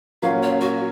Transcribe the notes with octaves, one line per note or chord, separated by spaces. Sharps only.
A#2 F#3 A#3 C#4 F4 F5
C#5
F#4